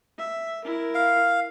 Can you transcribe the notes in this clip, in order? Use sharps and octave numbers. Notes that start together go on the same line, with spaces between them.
E5
E4 A#4
F5